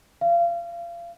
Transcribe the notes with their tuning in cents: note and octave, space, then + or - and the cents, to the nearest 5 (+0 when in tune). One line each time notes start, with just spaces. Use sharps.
F5 -30